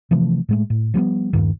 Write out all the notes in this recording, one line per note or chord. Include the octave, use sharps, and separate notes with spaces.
C3 E3 F3 A3
A2 G#3 A3
A2
F3 G3 A3 B3
D#1 A#1 G2 D#3